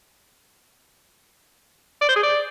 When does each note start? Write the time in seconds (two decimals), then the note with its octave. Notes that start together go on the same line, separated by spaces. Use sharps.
2.01 D5
2.09 C5
2.16 G#4
2.23 D5